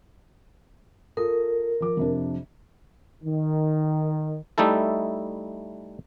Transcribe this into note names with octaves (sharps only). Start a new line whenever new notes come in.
F4 A4 A#4 D#6
F3 D6
F2 C3 D4
D#3
G3 A3 D#4 E4 A4